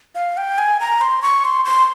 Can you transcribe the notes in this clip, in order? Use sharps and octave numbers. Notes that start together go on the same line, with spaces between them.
F5
G5
G#5
A#5
C6
C#6
C6
C6